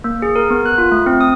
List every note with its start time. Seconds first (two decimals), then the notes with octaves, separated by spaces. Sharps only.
0.04 A#3
0.22 G#4
0.36 A#4
0.50 B3
0.66 F#6
0.78 F4
0.92 A3
1.06 C4
1.21 D#6